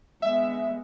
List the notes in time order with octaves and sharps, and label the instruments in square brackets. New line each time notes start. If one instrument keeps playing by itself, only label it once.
[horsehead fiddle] G#3 B3 [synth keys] E5